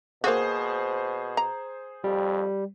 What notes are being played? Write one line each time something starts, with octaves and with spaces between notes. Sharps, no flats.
B2 A#3 F#4 G#4 C5
A#5
F2 G3